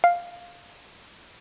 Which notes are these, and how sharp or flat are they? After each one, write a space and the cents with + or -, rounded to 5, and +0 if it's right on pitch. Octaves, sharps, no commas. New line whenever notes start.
F5 +5